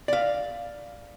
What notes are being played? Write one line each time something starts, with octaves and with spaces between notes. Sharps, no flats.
D5 F5